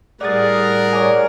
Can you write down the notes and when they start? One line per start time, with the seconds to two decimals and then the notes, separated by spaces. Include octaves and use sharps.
0.21 A2 G3 G#4 A#4 D5 F#5 A6
0.93 C#5 D5 G#5